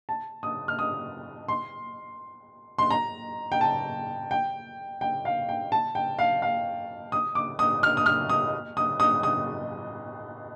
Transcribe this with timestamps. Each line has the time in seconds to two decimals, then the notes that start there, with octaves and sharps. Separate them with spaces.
0.09 A5
0.43 D#6
0.68 F6
0.79 D#6
1.48 C6
2.79 C6
2.91 A#5
3.52 G5
3.61 A5
4.31 G5
5.01 G5
5.25 F5
5.49 G5
5.72 A5
5.95 G5
6.19 F5
6.42 F5
7.12 D#6
7.35 D6
7.59 D#6
7.83 F6
7.97 D#6
8.06 F6
8.30 D#6
8.77 D#6
9.00 D#6
9.23 D#6